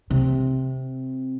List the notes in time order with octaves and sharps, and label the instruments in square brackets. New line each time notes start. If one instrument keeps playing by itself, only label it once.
[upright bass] C3